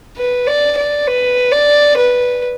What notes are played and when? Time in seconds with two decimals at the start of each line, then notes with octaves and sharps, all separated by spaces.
0.17 B4
0.47 D5
0.77 D5
1.07 B4
1.51 D5
1.97 B4